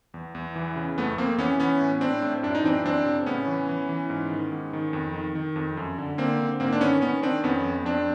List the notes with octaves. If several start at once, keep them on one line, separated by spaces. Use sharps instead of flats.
E2
E2
E3
C#3
F2 A3 B3
F2 A#3 C4
E3 B3 C#4
E3 B3 C#4
A2
A2 C4 D4
A2
F#2 D4
D#4
E3 C4 D4
F#2 C4 D4
C#3
A2 B3 C#4
E3
E3
E3
G#2
D#3
G#2
D#3
F2
D#3
D#3
F2
F#2
D3
D3 A#3 C4
D3
G#2 A#3 C4
D4
D#3 B3 C#4
D#3 B3 C#4
D#3 C4 D4
F2 B3 C#4
F2
F2 C4 D4